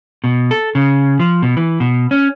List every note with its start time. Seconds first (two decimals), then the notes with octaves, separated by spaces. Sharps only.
0.24 B2
0.51 A4
0.75 C#3
1.19 F3
1.42 B2
1.57 E3
1.80 B2
2.11 C#4